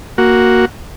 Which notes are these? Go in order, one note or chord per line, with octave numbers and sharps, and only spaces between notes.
A#3 F#4